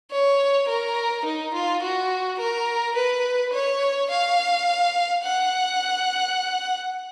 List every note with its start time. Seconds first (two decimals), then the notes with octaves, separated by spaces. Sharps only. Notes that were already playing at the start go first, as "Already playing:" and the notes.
0.12 C#5
0.68 A#4
1.25 D#4
1.54 F4
1.82 F#4
2.39 A#4
2.96 B4
3.53 C#5
4.10 F5
5.24 F#5